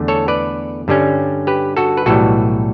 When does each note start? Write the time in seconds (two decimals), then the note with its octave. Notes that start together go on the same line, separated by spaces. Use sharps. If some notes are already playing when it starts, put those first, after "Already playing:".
Already playing: E2 D3 A3
0.08 A4 C#5
0.28 B4 D5
0.88 G2 D3 G3 C#4
1.47 G4 B4
1.77 F#4 A4
1.97 B4
2.06 B1 A2 E3 G3 F#4 A4